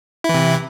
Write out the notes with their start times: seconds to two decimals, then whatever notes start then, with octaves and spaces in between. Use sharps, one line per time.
0.24 E4
0.29 E3
0.34 C3